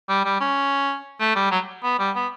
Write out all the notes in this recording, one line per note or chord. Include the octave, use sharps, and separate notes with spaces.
G3
G3
C#4
A3
G3
F#3
B3
G3
B3